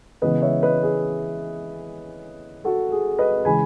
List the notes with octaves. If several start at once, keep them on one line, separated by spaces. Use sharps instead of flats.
C#3 E3 G#3 B3 B4 D#5
C#5 E5
B4 D#5
G#4
F#4 A4
G#4
B4 D#5
C#3 E3 G#3 G#5 B5